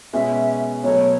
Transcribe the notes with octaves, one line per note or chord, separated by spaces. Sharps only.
B2 G#3 C#4 E5
B2 F#3 A3 C#5